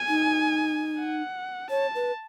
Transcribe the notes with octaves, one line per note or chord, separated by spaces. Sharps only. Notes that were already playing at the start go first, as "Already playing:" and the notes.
Already playing: G#5
D#4
F#5
C#5 A5
B4